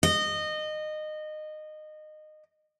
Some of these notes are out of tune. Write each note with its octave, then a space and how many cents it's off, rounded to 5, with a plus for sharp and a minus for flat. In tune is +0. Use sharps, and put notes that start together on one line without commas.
D#5 -20